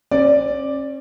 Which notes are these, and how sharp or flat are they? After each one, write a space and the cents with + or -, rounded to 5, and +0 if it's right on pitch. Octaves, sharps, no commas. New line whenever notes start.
C#4 -40 D5 +0